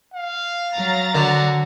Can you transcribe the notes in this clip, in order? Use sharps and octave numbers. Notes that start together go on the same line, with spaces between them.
F5
F#3 A#5 A6
D3 F#4